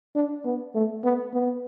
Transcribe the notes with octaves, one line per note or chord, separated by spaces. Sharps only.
D4
B3
A3
B3
B3